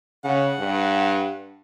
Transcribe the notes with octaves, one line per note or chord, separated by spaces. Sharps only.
C#3 F#5
G2